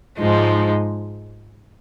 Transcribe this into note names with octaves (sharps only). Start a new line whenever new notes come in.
G#2 F3 G#3 D#4